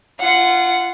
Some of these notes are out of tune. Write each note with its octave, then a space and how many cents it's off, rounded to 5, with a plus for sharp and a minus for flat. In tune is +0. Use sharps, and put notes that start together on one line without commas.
F4 -20 F#5 +0